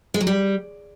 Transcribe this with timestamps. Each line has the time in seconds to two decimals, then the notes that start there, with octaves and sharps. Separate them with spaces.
0.14 G#3
0.21 F#3
0.27 G3